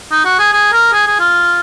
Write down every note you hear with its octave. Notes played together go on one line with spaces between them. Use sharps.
D#4
F#4
G#4
G#4
A#4
G#4
G#4
F4